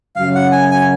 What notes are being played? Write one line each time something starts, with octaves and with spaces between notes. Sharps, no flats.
F#2 C#3 F#3 F5
F#5
G#5
G#5